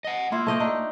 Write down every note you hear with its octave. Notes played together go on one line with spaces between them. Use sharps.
D#5 F#5
A#3 E4 F4
A3 D#5 G5
D4 D#4